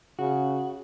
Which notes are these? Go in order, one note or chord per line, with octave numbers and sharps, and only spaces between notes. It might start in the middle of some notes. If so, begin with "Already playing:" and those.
C#3 F#4